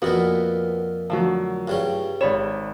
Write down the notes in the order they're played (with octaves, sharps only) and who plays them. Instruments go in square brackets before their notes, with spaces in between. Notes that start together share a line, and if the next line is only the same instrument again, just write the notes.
[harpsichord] F2 A#2 A#3 [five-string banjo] B3 F#4
[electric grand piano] D3 F#3 [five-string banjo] F3 A3 F#4
[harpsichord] G2 C#3 G3
[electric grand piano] G#1 B5 E7 [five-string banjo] C#5 D5